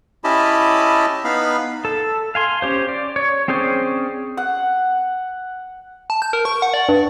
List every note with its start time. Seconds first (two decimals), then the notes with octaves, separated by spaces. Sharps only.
0.24 C#4 E4 G4 D#5 A5 B5
1.24 B3 D#4 F5 B5
1.85 A4
2.35 F5 G#5 C6
2.62 C#4 G4 C5
2.89 D5
3.16 C#5
3.48 C4 C#4 G#4 C5 D5
4.37 F#5
6.10 A5
6.22 G6
6.33 A#4
6.45 C#6
6.62 F#5
6.74 D5
6.89 G2